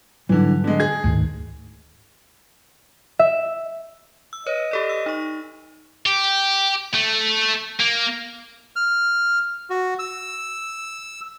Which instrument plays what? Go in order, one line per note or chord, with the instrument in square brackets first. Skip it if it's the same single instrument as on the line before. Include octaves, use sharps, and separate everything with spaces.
[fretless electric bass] G#2 F#3 G3 [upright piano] D3 E3
[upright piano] D3 G#3
G#4 G#6
[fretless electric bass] D2 G#2 D#3
[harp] E5
[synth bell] E6
[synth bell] B4 C#5 [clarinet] D#5
[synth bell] G4 A4 D5
E6
D#4 C#6
[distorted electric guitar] G4
A3
A#3
[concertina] F6
F#4
E6